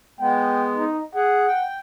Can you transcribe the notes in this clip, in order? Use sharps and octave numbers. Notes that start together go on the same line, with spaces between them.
G#3 B3 G5
D#4
G#4 F#5
G5